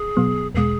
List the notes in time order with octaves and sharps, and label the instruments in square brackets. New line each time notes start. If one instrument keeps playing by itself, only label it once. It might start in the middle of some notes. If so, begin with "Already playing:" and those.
Already playing: [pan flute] G#4
[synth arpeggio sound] B2 F#3 B3
[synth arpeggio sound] E2 B2 G#3 [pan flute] G#4